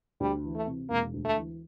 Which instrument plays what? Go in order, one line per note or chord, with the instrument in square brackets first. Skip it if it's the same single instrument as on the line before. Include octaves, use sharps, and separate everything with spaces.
[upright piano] D2 [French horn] G3
[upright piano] E3
[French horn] A3
[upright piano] C3
[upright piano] E1 [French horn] A#3
[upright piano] D2
[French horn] A3
[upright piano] E3